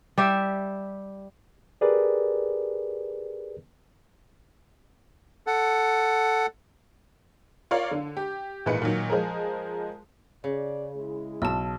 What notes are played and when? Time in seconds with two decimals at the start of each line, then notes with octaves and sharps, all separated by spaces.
0.18 G3 G4 E5
1.81 G4 G#4 A#4 B4 D5
5.47 A4 F#5
7.71 F4 A#4 C#5 D5 F5
7.91 D3
8.17 G4
8.66 G#1 A#2 E3 G#3 B4 C#7
8.82 A#2 D#3 F#3
9.10 F3 G#3 G#4 A#4
10.44 C#3 D5
10.96 G#3 E4
11.42 B1 A5 E6